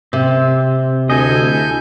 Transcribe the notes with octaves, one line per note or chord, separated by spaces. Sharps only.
C3 C4
D2 E4 A4 D#5 G#5 G6